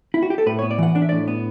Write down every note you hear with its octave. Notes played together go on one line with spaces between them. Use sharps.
E4
F#4
G4
A4
A2 B4
B3 C#5
D5
E3 F#5
D4 D5
E5
A2 D5
B3